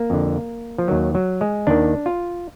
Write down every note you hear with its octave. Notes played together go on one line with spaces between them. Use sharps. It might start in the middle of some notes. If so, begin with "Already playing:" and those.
Already playing: A#3
F2 D3
F3
D#2 D#3 F#3
F#3
G#3
D#2 D#3 D4
F4